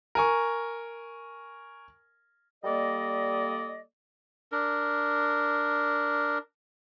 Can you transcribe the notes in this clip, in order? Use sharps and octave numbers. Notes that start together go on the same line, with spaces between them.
A#4 G#5 C#6
G3 A#3 A4 D5 D#5
D4 A#4